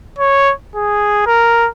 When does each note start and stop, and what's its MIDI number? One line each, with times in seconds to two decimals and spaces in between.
0.18 0.53 73
0.75 1.26 68
1.26 1.68 70